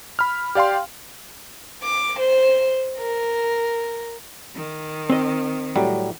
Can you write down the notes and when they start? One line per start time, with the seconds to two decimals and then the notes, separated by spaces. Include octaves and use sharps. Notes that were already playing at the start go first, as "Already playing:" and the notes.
0.19 B5 F6
0.55 G4 D5 F5 G5 C6
1.83 D6
2.19 C5
2.98 A#4
4.54 D#3
5.10 C4 D#5
5.76 A2 F#3 G3